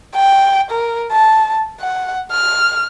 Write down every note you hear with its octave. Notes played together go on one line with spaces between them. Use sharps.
G5
A#4
A5
F#5
F6